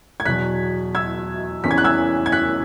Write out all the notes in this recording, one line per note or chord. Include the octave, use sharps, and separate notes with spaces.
G#6
E2 B2 F#3 F#6 B6
E6 G#6
E2 E3 C#4 B6
G#6
F#6
E6 G#6
G#6
F#6 B6